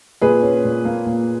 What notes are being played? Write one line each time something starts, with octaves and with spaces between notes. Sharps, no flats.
A#2 G#4 B4
C#4
A#2
A#3
A#2